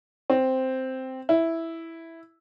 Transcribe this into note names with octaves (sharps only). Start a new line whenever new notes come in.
C4
E4